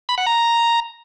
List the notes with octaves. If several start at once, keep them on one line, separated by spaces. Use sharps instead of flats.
B5
F#5
A#5